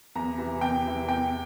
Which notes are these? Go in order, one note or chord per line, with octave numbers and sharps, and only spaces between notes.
E2 A#5
C3 E3
E2 G5
C3 E3
E2 G5